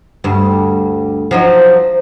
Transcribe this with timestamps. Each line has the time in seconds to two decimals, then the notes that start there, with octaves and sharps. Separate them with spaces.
0.24 D2 G2
1.31 F3 F#3 D#4